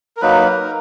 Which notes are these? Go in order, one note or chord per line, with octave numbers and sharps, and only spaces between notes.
A#4
F#3 A#3 D#4 B4
A#4